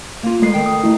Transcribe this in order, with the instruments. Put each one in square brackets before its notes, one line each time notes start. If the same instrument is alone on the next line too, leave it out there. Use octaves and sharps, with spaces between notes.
[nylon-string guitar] A#3 F4
[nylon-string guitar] G#3 B4 [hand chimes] A3 C7
[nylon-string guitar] D#3 G5
[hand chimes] D#6
A3 E4